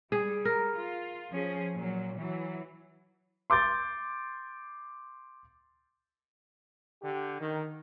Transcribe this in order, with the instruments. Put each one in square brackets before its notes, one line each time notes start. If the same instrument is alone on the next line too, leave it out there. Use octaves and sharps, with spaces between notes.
[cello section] G3 [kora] G#4
[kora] A#4
[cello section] F4
F3 C#4 G#4
A#2 F#3
E3 F#3
[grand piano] C6 D6 G6 A6
[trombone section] D3 G4
D#3